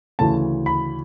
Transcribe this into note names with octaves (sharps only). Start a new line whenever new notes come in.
D2 C#3 E3 A5
B5